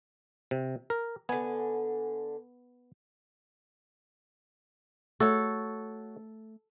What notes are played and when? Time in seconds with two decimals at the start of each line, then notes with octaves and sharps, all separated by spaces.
0.51 C3
0.90 A#4
1.29 D3 B3 G#5
5.20 A3 F#4 A4 C#5